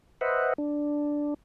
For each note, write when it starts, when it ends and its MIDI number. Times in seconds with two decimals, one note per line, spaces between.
0.21 0.53 71
0.21 0.53 72
0.21 0.53 75
0.21 0.53 76
0.21 0.53 78
0.58 1.34 62